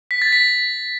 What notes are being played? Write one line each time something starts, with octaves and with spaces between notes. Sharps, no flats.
B6
A6
B6